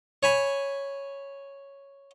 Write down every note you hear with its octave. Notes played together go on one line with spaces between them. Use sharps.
C#5 G#5 B5